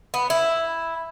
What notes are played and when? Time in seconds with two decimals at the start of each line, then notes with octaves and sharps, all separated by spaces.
0.14 B3
0.30 E4